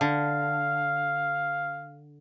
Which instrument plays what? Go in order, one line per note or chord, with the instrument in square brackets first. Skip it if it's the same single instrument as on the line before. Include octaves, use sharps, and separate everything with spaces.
[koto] D3 [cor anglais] F5